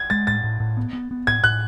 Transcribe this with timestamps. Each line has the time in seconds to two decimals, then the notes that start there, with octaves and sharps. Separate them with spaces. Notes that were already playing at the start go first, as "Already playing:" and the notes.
Already playing: G#6
0.10 G#3 A6
0.27 A2 A6
0.44 A2
0.60 A2
0.77 B3
0.93 B3
1.11 B3
1.27 A2 G#6
1.44 A2 F#6